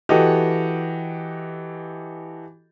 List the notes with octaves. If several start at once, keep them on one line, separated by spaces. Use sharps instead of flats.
E3 F#4 G4 A4 D#5